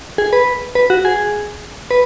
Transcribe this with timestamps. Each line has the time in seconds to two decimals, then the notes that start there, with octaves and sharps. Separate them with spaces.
0.18 G#4
0.33 B4
0.75 B4
0.90 F#4
1.05 G#4
1.91 B4